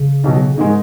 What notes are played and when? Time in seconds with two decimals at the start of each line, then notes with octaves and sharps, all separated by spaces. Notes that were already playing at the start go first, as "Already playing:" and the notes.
Already playing: C#3
0.24 B1 B2 F#3
0.57 G#2 D#3 G#3 D#4